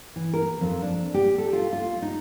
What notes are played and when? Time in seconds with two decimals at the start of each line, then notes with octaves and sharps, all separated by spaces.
0.16 E3
0.33 A#4
0.61 F2
0.82 D4
1.14 G4
1.38 A4
1.53 F4
1.73 F4
2.02 D#4